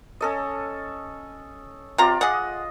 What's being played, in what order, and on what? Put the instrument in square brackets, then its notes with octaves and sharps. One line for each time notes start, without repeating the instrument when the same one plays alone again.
[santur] C#4 A4 D#5
[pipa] C3 A#5 [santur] F4 D5
[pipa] G#4 F#5 [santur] D#5